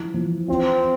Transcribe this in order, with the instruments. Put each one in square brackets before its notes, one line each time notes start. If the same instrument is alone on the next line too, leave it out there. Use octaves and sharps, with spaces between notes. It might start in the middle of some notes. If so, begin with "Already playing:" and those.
Already playing: [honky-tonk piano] E3 F3
F3
[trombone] C4 [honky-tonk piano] F4